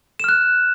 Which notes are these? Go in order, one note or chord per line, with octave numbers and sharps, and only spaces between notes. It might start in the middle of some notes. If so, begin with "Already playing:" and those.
F6 F#6 E7